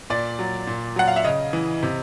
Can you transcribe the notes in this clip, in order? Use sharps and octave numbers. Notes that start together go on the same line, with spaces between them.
A#2 D5
F#3
A#2
F#3 F#5
F5
E5
C#3 D#5
E3
C3